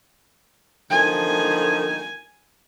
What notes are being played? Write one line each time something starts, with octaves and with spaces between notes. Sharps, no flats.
D3 D#3 F3 G#5